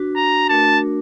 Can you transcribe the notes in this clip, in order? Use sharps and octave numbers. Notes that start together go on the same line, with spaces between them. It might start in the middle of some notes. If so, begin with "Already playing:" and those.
Already playing: D4 F#4 B4
A#5
A3 D4 F#4 A#4 A5